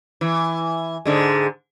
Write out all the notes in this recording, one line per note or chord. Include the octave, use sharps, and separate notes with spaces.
E3
G#2 D3 G#3